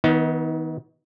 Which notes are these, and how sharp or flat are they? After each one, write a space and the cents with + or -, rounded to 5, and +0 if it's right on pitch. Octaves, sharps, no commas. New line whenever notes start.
D#3 +40 B3 +0 D#4 +30